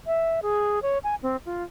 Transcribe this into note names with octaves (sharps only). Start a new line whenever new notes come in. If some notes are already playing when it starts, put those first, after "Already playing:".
E5
G#4
C#5
G#5
C4
F4